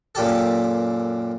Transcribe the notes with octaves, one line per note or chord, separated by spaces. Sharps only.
F#2 A#2 G4 A4